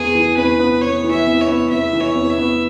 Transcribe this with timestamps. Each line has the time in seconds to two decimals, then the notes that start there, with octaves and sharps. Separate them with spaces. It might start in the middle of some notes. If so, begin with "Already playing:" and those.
Already playing: E2 G#4
0.15 E3
0.37 E2 B4
0.59 B3
0.81 E2 C#5
1.04 E3
1.11 E5
1.26 E2
1.42 C#5
1.48 B3
1.70 E2 E5
1.93 E3
2.01 C#5
2.15 E2
2.30 E5
2.38 B3